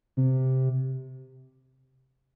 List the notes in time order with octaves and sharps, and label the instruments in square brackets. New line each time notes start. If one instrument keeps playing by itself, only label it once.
[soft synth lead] C3